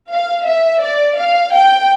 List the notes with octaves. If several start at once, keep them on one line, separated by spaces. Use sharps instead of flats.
F5
E5
D5
F5
G5